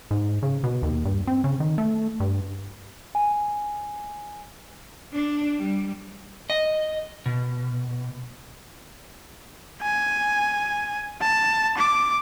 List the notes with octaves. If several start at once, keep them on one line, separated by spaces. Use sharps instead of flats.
G#2
C#3
B2
D#2
G2
C4
C#3
D#3
A3
G2
G#5
D4
G3
D#5
B2
G#5
A5
D6